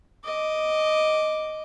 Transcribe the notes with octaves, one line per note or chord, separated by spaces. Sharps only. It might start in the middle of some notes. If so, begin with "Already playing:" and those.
D#5 D6